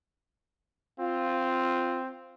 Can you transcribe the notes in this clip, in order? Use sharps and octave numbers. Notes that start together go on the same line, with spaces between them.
C4 F4